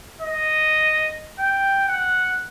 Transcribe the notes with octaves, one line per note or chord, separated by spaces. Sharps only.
D#5
G5
F#5